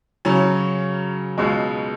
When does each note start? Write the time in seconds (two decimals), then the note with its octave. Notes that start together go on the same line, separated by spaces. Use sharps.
0.25 C#3 F#3 C#4
1.38 C#2 B2 G#3